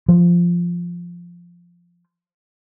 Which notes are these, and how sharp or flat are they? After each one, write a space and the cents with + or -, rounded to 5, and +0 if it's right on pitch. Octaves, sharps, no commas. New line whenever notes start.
F3 -5